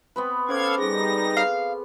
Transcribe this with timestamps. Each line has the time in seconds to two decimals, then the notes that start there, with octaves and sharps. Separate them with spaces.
0.16 B3 C4 B4
0.49 C#4 A4 C5 F5 D6 G#6
0.78 G3 D#4 G#4 A4 A#6
1.37 F5